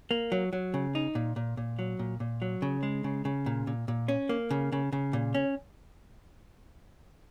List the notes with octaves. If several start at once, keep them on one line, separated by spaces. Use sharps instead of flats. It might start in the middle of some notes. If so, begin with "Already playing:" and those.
A#3
F#3
F#3
C#3
D#4
A#2
A#2
A#2
F#3
A#2
A#2
F#3
C#3
G#3
C#3
C#3
A#2
A#2
A#2
C#4
A#3
C#3
C#3
C#3
A#2
C#4